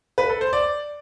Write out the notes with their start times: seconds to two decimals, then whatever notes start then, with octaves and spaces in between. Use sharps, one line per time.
0.18 B4
0.29 A4
0.41 C5
0.53 D5